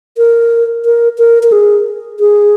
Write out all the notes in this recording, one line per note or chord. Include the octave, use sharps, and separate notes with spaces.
A#4
A#4
A#4
A#4
G#4
G#4